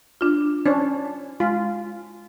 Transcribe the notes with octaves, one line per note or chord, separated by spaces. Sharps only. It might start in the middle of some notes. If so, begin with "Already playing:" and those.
D4 F4
C#4 D4 C5
G#3 F4